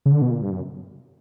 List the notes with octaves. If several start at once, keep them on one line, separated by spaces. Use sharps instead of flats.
C#3
D3
B2
A#2
G2
F#2